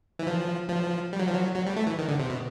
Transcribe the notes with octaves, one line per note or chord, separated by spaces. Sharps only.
E3
F3
F3
G3
F#3
F3
F#3
F#3
G3
A3
E3
D#3
D3
C3
B2